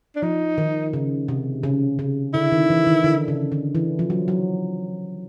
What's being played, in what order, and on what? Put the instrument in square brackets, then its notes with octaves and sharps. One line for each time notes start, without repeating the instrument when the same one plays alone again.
[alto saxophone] D4
[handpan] F3 [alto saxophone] D#4
[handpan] D#3
C#3
C3
C#3
C#3
[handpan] D3 [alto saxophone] E4
[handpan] D#3
E3
D#3
D3
C#3
D3
E3
F3
F#3
F#3